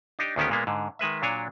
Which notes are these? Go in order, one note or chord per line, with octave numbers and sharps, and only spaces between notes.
D4 D#4 G4
D2 D3 D#3 B3 C#4 G4
A#2 G#3 A#3 B3
G#2 D3
D#3 G#3 B4 E5
A#2 F#3 D4 C#5 G#5